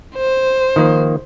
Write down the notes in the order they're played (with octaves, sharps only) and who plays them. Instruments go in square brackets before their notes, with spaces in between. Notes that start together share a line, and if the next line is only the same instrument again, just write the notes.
[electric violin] C5
[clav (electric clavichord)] D#3 F3 A#3